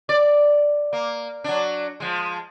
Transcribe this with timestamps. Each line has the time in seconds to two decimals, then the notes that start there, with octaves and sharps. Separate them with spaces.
0.09 D5
0.93 A#3
1.44 F#3 D4
2.00 F3 G#3